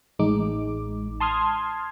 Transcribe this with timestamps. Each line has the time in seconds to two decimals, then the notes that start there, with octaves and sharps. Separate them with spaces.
0.19 A1 G#3 D#4 D6
1.20 A5 C6 D#6 F6 G#6